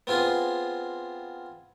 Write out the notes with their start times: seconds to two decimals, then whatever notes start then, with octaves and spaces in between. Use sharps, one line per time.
0.07 B3 C4 F4 G#4